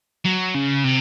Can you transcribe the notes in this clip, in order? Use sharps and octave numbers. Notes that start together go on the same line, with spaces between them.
F#3
C#3
C3